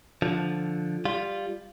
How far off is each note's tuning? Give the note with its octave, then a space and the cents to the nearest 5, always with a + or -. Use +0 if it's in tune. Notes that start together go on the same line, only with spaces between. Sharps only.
D3 +0 F3 +0
G3 +10 F4 +0